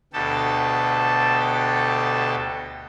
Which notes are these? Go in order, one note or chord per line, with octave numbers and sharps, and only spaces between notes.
D2 B2 G4 A4 A5